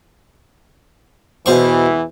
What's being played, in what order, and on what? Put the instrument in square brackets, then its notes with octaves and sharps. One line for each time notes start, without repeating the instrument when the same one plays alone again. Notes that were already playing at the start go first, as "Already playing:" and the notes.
[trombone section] E2 E3 [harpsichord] B2 C5 C#6